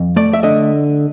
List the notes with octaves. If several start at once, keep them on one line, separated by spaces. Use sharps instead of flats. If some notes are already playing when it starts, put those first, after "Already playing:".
Already playing: F2
A3 D5
E5
D3 D#5